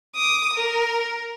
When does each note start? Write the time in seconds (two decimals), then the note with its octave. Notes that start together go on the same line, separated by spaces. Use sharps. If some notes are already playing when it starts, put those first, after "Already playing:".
0.15 D6 D#6
0.53 A#4